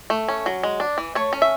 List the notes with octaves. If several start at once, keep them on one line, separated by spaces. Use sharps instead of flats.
A3
C#4
F#3
G#3
D4
E3
A3 C#5
C#4
E5